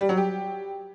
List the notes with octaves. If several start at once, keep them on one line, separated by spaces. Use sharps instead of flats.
G3
F#3
G4